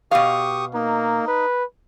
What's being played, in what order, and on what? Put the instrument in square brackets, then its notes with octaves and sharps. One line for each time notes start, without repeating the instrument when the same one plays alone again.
[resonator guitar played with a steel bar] B2 F5 [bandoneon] G4 C#6 D#6
[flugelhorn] A#3 [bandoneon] D#4
[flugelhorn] B4